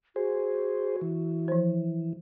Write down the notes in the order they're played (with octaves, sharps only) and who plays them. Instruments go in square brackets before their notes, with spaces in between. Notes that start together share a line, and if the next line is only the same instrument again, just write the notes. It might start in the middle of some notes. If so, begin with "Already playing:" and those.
[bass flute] F#4 [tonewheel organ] G#4 C5
[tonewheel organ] E3
[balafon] F3 C5